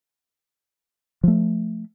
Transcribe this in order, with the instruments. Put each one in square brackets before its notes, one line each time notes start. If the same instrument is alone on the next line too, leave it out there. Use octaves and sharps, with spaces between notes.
[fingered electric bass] F3 A3